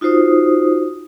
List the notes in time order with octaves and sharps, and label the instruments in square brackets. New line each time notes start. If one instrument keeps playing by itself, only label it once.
[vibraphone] D#4 F4 F#4 C5 D#6